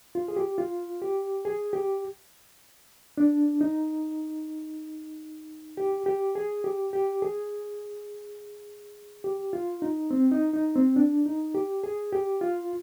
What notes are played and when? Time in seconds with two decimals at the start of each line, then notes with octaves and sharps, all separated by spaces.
0.15 F4
0.28 G#4
0.37 G4
0.58 F4
1.02 G4
1.45 G#4
1.73 G4
3.18 D4
3.61 D#4
5.77 G4
6.06 G4
6.35 G#4
6.64 G4
6.93 G4
7.22 G#4
9.24 G4
9.53 F4
9.82 D#4
10.11 C4
10.32 D#4
10.53 D#4
10.75 C4
10.96 D4
11.26 D#4
11.54 G4
11.84 G#4
12.13 G4
12.41 F4